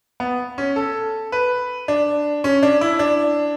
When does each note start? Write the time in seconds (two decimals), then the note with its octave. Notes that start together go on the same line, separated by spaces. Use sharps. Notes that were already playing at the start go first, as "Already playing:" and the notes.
0.20 B3
0.58 C#4
0.76 A4
1.32 B4
1.88 D4
2.44 C#4
2.63 D4
2.81 E4
2.99 D4